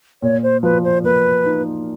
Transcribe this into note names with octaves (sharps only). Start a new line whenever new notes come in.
A#2 C#5
C5
F3 B4
C5
A#3 B4
D#4